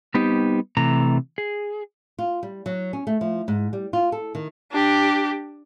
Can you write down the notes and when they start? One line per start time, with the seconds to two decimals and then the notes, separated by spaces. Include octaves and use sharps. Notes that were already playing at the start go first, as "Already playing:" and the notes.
0.14 G3 B3 C4 D#4 G4
0.77 C3 E3 A3 A#5
1.38 G#4
2.19 F4
2.43 G3
2.66 F#3
2.93 C#4
3.07 A3
3.21 F3
3.48 G#2
3.73 G3
3.93 F4
4.12 A4
4.35 D#3
4.72 D4 G4